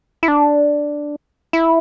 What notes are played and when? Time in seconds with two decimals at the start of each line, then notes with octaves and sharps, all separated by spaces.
0.23 E4
0.28 D4
1.53 E4